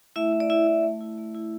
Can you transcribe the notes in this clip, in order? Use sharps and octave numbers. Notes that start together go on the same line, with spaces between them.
A3 E4 E5
E4
D5
A3 E4 E5
E4
A3
E4
A3
E4